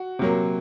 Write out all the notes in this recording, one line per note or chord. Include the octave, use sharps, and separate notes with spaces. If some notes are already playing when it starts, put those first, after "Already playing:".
Already playing: F#4
C3 F#3 A#3